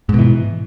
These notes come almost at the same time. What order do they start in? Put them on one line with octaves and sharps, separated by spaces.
G#2 B2 E3